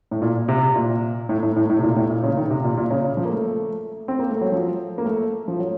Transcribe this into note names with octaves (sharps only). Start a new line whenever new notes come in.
A2
A#2
C3
A#2
A2
A2
A2
A2
C3
A#2
A2
A#2
C#3
D#3
C3
A#2
A#2
C#3
C#3
F3
A#3
A3
C4
A#3
A3
F#3
F3
A#3
A3
F3
F#3